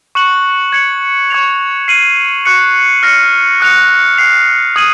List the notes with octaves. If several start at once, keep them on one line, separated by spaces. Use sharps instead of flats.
C#6 F#6 C#7 F#7
G#6 C#7 F#7
C#6 G#6 C#7 F7
F6 C7 D#7 F#7
C#6 F#6 C#7
F6 A#6 C#7
D#6 F#6 C#7 F7
F#6 C7 F7
D#6 G#6 D#7 F#7